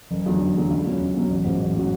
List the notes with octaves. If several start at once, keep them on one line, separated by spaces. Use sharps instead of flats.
F#1
E2 D3 F#3
F#1
E2 D3 F#3
C#2
B2 F#3 C#4 F#4
C#2
B2 F#3 C#4 F#4
A1
G#2 F#3 C#4 F#4
A1
F#3 C#4 F#4